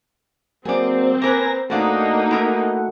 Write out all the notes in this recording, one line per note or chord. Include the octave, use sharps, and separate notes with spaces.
F#3 A#3 C4 G#4 D5
A#3 A#4 B4 G#5 A#5 A#6
A2 A3 A#3 D4 D#4 F#4 F5
E4 A#4